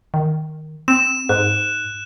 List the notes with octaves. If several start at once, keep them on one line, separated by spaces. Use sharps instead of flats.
D#3
C4 E7
G#2 F#6